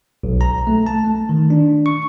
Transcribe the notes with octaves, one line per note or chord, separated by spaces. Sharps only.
B1
A#5
A3
A5
A3
D#3
D4
C#6